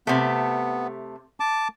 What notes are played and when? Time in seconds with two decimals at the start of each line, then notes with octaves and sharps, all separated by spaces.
0.07 C3 A3 B3
1.40 A5 D6